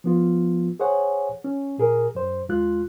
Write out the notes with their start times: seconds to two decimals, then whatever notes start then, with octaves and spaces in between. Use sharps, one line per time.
0.04 F3 B3 F4
0.80 G#4 C5 C#5 F#5 G#5
1.44 C#4
1.78 A#2 G#4 A#4
2.15 F#2 C5
2.49 D#2 G#3 F4 F#6